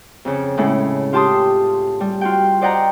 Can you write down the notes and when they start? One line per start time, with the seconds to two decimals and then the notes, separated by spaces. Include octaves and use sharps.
0.25 F2 C#3
0.58 A2 C#3 G#3 C#4 E4 A4
1.13 F4 G4 A5 C6 D#6
2.00 G3
2.21 F4 F#4 G5
2.61 C5 D5 D#5 F#5 G5 A#5